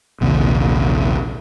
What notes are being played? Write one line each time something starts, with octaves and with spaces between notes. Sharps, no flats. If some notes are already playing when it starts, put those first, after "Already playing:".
A#1 D#2 C3